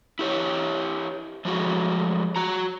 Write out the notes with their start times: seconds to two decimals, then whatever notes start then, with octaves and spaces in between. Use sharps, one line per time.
0.19 E4 G4 C#5
1.45 F3 F#3 G#3 A3 F#4
2.36 F#4 A#5